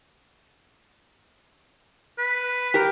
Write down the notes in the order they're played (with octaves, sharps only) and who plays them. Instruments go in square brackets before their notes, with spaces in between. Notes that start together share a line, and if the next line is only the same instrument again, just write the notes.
[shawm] B4
[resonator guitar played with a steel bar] G4 A#4